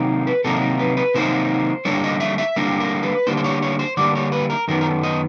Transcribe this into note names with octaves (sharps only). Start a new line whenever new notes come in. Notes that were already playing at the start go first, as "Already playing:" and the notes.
Already playing: C3 D#3 F#3 A#3 D#4
B4
C3 D#3 F#3 A#3 D#4 A4
A#4
B4
B4
C3 D#3 F#3 A#3 D#4 C5
D3 G3 A#3 D4 C#5
D#5
E5
E5
D3 G3 A#3 D4 A#4
A#4
B4
D3 G3 A#3 D4 C5
C5
C#5
C#5
C5
D3 G3 A#3 D4 D5
C#5
B4
A#4
F#2 D#3 F#3 B3 A#4
A#4
A4
D#5